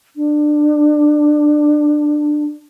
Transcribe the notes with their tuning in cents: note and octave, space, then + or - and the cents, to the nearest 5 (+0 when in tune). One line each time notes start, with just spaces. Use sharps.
D4 +20